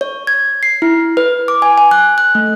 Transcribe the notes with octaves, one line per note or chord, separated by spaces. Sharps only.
C#5
G#6
C7
E4
B4
D6
G#5
G#5
F#6
F#6
A3